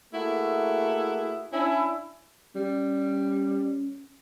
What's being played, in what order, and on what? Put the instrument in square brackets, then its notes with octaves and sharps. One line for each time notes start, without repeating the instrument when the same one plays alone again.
[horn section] A3 A#3 E4 F#4 G#4
C#4 D4 E4
[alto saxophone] G3 [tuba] C#4